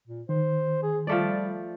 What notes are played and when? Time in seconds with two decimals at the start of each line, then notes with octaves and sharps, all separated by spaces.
0.08 A#2
0.29 D#3 C5
0.83 G#4
1.07 F3 G3 A3 D5